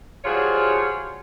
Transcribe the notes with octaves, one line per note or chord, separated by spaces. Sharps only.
F3 G3 F4 F#4 G#4 C#5